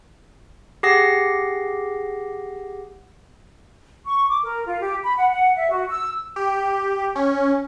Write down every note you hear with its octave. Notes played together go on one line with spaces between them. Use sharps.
G4 G#4 F#5 A#6 C7
C#6
D6
A#4
F4
G4
B5
F#5
F#5
E5
F#4
E6
G4
C#4